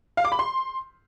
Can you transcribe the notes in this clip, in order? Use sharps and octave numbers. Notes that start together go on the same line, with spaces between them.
F5
D6
B5
C6